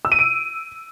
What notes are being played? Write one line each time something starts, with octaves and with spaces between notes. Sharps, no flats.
E6
D#7
D7